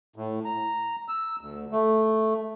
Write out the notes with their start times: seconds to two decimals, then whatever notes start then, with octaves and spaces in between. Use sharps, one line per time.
0.16 A2
0.45 A#5
1.08 E6
1.41 D2
1.71 A3